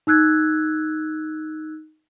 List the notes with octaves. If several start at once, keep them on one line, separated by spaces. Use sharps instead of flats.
D#4 E6 F#6 G#6